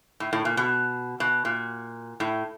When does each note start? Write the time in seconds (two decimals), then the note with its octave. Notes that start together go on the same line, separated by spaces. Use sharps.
0.20 A2
0.33 A2
0.45 A#2
0.57 B2
1.20 B2
1.45 A#2
2.20 A2